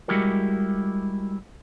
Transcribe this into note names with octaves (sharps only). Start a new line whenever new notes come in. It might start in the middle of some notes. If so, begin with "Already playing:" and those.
G3 G#3 E4 F#4 G4 A#4